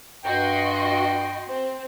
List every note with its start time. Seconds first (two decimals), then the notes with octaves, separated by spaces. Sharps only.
0.24 G2 F#4 D#5 G5 C6
1.48 C4